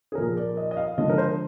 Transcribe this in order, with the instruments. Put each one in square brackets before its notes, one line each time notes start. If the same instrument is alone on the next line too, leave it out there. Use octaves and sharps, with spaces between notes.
[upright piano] G#4
A#2 F3 A#3 A#4
D5
D#5
D#5
F5
D3 F3 G#3 D4 D#5
A#4
C5